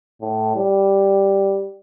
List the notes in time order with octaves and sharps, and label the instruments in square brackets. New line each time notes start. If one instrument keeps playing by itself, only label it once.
[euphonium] A2
G3